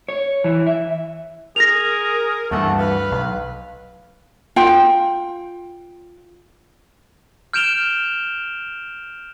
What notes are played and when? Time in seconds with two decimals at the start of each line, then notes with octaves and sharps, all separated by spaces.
0.09 C#5
0.44 E3
0.67 E5
1.56 G#4 A#4 A#6 F7
2.51 D2 G2 E3 A3 F#5
2.79 B4 F5
3.11 B1
4.56 F4 G5
7.53 F6 G6 D7 E7 F7 G7